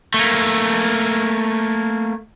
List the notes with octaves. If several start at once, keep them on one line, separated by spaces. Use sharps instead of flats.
A3 A#3